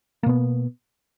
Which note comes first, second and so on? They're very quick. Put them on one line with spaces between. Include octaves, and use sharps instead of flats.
A#3 B2 B3